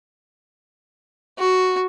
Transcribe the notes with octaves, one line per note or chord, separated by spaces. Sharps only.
F#4